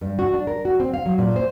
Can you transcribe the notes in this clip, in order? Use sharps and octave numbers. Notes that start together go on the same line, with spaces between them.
G2
F#4
D4
A#4
F#4
C4
F5
F#3
A#2
C5